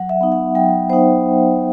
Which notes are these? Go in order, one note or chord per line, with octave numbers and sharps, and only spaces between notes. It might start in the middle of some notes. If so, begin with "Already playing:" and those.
Already playing: F#3 F#5
E5
B3 D#4
F#5
F#3 G5
B3 D#4 C5